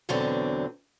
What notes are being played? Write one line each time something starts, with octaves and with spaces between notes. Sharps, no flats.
E2 B2 D3 F#3 C4 D4